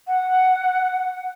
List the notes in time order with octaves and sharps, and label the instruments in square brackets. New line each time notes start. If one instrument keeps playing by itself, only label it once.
[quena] F#5